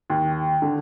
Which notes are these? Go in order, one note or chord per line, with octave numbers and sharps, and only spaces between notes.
D#2
D3